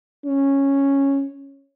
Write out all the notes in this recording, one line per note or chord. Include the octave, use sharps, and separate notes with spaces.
C#4